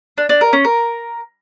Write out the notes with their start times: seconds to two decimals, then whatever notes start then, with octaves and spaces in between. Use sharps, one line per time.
0.18 D4
0.29 D4
0.41 A#4
0.53 C#4
0.65 A#4